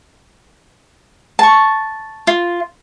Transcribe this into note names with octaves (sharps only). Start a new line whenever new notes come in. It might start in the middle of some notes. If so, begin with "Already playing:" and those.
A5 C#6
F4